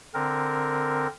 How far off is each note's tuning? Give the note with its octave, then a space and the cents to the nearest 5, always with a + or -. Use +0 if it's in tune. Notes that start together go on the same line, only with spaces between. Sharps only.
D3 +0 C4 +0 A#4 +0